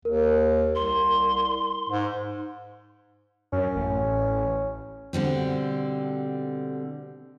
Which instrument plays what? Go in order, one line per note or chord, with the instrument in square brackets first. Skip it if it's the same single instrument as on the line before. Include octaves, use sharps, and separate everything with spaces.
[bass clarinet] D#2 [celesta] A#4
[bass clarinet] C2 [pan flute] C6
[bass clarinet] G#2
[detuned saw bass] F#2 [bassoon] C#4
[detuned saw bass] A1
[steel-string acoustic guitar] B2 D3 G3 C4